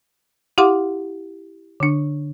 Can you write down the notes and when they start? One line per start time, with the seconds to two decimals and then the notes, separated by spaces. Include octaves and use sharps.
0.58 E4 G4 F5 F#5 C6 D6
1.80 D3 D4